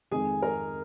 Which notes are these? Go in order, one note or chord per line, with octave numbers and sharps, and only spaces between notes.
F2 D#3 G#3 G#4 G#5
A#4 A#5